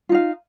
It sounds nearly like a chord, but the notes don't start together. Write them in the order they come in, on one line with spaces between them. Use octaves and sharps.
F4 D#4 F5